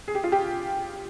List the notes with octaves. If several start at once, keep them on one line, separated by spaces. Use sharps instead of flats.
G#4
G4
F4
G4